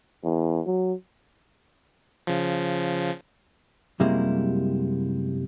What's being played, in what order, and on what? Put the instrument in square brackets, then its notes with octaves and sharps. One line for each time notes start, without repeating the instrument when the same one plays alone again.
[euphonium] E2
F#3
[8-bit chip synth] C#3 F3
[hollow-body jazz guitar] F#2 C3 G3 G#3 A#3 E4